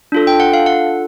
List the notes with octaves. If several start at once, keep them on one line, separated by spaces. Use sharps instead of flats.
D4 F4 A4
G5
F#5
F5
F#5